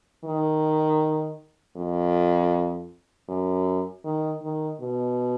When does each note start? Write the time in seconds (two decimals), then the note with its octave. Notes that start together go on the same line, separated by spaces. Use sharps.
0.25 D#3
1.77 F2
3.29 F#2
4.04 D#3
4.43 D#3
4.80 B2